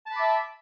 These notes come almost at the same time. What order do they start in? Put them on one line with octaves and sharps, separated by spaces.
A5 B5 D6 E5